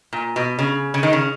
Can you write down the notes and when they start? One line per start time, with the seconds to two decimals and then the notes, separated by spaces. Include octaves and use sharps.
0.13 A#2
0.36 B2
0.59 C#3
0.94 C#3
1.03 D#3
1.13 C#3